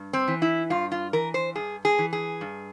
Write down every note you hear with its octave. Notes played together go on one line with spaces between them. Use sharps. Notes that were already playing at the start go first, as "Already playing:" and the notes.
Already playing: G2
C4
E3
E4
G2 F4
F4
E3 A#4
C5
G2 G#4
G#4
E3
G#4
G2